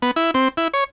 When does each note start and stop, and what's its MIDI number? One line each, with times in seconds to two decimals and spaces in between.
0.02 0.11 59
0.16 0.31 64
0.34 0.48 60
0.57 0.68 64
0.74 0.84 73